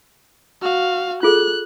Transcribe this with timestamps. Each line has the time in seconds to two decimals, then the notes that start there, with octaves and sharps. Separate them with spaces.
0.62 F#4 F5
1.23 F4 G#4 A4 F#6